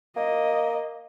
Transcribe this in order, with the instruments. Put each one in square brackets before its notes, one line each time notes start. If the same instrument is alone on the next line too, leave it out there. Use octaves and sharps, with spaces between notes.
[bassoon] A#3 [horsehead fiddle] D#5